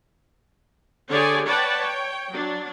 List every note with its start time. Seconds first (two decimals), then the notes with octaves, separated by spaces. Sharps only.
1.09 D3 G4 G#4 C#5 D5 G#5
1.45 B4 C#5 D5 F#5 G5 A5
1.79 C#5 G5
2.32 F#3 D4